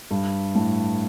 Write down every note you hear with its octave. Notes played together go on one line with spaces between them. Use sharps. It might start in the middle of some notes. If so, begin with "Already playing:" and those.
G2
A2